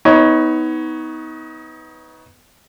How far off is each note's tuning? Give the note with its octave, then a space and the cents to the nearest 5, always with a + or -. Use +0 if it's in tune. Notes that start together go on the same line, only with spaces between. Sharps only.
B3 +15 D#4 +30 C#5 +0